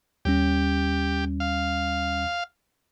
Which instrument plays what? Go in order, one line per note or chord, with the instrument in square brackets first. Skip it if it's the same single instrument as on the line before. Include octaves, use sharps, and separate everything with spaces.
[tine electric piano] D#2 G3 C#4 [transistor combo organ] G4
[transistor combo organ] F5